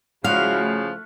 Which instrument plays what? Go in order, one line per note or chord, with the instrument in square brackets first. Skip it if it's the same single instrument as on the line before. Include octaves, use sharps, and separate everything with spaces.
[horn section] C#3 F3 [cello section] G#3 E4 F#4 [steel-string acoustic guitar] F5 [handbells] F6 F#6
[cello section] A3